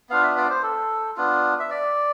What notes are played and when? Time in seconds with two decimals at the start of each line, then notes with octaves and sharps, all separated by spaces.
0.09 B3 D4 F4 F5
0.23 E5
0.37 D5
0.50 C5
0.63 A4
1.17 B3 D4 F4
1.60 E5
1.70 D5